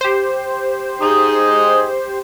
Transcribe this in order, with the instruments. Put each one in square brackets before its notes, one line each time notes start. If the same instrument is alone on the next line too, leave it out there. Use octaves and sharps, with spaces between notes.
[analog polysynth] G4 C5
[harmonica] D#4 G#4 D#5